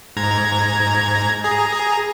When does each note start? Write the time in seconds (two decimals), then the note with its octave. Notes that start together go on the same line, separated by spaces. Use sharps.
0.16 G#2 A#5 G#6
1.44 G#4 A#5